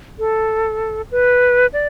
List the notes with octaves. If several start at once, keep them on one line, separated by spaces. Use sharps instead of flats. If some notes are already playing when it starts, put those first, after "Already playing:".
A4
B4
D5